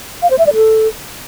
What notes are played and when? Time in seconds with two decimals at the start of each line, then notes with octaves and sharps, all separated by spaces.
0.23 F5
0.31 C5
0.39 E5
0.47 D5
0.55 A4